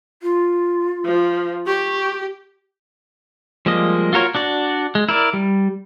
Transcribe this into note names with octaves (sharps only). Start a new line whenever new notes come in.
F4
F3
G4 C#6
F3 G3 G#3 A#3 D#5
F4 F#4 A#4 C#5
D4 F#4 D5
G#3
E4 A#4 D5
G3